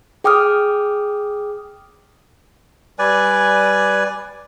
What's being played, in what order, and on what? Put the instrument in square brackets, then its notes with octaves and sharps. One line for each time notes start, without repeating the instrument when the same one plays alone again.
[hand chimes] G#4 G5 D6 D#6 F6
[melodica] G3 B4 D5 G#5